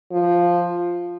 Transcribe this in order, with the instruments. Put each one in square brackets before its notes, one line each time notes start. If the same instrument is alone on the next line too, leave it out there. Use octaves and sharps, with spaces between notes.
[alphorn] F3